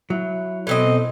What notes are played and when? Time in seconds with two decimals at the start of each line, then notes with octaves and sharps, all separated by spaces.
0.10 F#3 E4
0.67 B2 E3 C4 A4 D#5